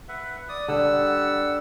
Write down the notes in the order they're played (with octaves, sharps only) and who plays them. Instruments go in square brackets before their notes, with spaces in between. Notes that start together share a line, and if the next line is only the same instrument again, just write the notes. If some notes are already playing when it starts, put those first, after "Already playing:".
[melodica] B4 E5 F#5
D5 D#6
[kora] D3 [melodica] G3 F#5 E6